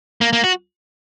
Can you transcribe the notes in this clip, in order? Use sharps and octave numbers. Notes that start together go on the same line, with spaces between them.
A#3
A#3
F#4